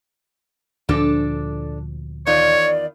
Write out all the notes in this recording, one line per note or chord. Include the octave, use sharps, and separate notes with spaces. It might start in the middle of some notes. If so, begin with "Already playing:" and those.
D2 A#2 F3 D4 A4
E2 D#3 F4 C#5 D5